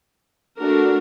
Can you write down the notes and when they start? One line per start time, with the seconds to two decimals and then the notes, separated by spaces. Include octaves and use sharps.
0.58 A3 D4 F#4 A#4